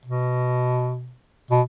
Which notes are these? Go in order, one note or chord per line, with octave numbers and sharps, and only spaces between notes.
B2
B2